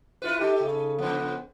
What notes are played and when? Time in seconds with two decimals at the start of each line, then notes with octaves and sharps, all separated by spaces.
0.22 E4 F4 B4
0.39 D#4 G4 A4
0.63 C#3
0.99 C#3 F3 B3